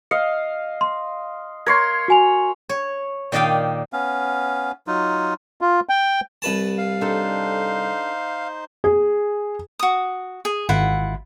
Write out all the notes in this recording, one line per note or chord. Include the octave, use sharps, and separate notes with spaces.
D#5 F5 C#7
C6
A#4 C#5 C6 G#6
F#4 G#5 F7
C#5
A#2 D#3 D5 D#5 F5 G5
B3 C#4 F5
F#3 D#4 F4
F4
G5
C2 B4 A5
F5
D4 D#4 A4 C5
G#4
F#4 D#6
G#4
G#1 E4 F4 F#5